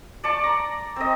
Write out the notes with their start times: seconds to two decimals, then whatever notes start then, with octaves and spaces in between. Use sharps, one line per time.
0.24 D5 A5 C#6
0.43 A#5
0.96 C4 D#5